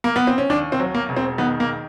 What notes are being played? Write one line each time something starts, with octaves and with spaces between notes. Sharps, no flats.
A#3
B3
C4
C#4
D#2 D4
C4
F#3
A#3
E1
C4
D#3 B3
A#3